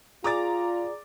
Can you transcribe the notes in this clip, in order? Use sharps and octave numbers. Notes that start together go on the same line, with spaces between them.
F4 G#4 D5 A#5 D6 A6